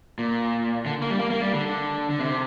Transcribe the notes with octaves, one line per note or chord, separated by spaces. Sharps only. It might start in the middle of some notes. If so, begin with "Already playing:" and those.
A#2
D3
A#3
G3
A#3
A#3
G3
D3
D3
C3